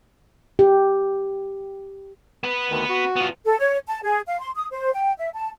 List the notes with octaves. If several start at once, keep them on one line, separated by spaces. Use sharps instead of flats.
G4
B3 B4
D2 D#3
F#4
B3 F4
A4
C#5
A5
G#4
F5
C6
D#6
C5
G5
E5
A5